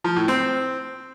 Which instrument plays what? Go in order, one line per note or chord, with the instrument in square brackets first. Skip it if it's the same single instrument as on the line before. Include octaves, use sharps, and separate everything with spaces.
[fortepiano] F3
A2
C4